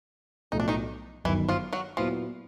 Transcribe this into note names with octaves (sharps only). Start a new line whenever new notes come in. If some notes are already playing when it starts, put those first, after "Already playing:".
B1 A2 F3 A3 D#4
D4
D#3 D#4
G1 F#2 D#3 E3 E4
F3 F4
F#3 F#4
A#2 F3 F#3 B3 E4 F4